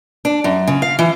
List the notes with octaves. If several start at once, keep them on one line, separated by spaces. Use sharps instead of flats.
D4
F#2
C#3
F5
E3